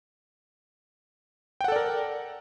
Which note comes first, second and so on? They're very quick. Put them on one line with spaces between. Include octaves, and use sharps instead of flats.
G5 F#5 A4 D5 A#4